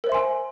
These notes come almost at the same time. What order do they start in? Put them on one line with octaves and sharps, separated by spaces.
A#4 C5 E5 C6 G#5